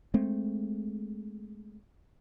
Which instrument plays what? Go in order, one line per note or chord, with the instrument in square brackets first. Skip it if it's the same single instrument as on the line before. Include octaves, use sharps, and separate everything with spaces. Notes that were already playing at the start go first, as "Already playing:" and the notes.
[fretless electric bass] G#3 A3 C4